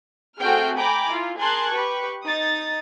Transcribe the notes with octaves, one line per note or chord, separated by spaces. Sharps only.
A3 C4 F#4 G#4 G5 F6
G5 G#5 A#5 B5 D6
E4 F4
G#4 A#4 A5 C6 F#6 G#6
G4 B4 C#6
D#4 D#6 A6